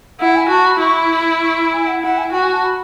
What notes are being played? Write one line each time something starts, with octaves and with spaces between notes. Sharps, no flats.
E4 F#5
G#5
F#4 A5
B5
E4 C#6
B5
B5
C#6
B5
G#5
F#5
E4 F#5
G#5
F#4 F#5
G#5
A5
B5